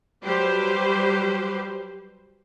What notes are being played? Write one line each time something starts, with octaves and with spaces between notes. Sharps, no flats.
F#3 G3 G4 B4 C5